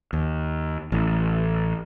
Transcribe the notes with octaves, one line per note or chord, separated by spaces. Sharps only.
D#2
A1